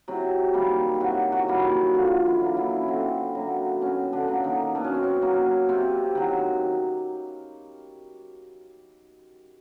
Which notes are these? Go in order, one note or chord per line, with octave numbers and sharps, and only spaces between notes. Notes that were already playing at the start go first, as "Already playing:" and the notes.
C3 F#3 F#4
D#3 G3 A#3
G4
C3 F#3 F#4
F#3 F#4
D#3 G3 A#3
F#3 F#4
D3 F3 F4
E3 E4
F#3 A#3
E3 E4
C#4
D3 C4
F#3 A#3
B2 C#4
D3 D4
F#3 A#3
D#3 D#4
B2 D4
C#4
C4
C#4
F#3 A#3
C3 C4
D#3 F#3